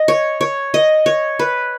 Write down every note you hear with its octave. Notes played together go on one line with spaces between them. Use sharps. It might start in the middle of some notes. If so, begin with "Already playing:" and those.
Already playing: D#5
C#5
C#5
D#5
C#5
B4